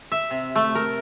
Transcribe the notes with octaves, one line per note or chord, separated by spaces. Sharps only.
E5
C3
A3
A#4